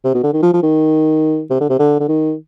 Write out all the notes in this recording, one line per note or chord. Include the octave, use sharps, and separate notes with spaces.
C3
B2
D3
D#3
F3
F3
D#3
C3
D3
C3
D3
D3
D#3